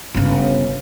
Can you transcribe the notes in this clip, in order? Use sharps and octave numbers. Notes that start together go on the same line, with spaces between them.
G1 C#3